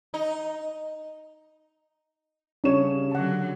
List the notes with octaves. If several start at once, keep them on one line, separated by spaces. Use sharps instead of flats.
D#4
C#3 G3 D4 C#5 E7
D3 F#3 F#5 A5